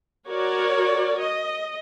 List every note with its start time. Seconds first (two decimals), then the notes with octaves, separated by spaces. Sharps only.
0.28 F#4 A#4 C#5 D5
1.19 D#5